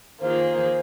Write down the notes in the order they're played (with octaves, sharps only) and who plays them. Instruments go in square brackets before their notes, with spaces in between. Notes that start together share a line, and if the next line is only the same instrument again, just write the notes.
[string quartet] D#3 A#3 F4 G#4 [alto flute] C5